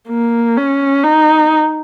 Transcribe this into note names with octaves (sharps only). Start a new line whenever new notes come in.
A#3
C#4
D#4